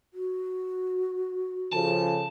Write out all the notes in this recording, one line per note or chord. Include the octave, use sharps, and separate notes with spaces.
F#4
C#3 F3 A4 A5